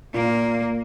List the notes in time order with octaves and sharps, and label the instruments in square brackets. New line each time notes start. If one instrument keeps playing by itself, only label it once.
[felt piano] A#2 [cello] A#3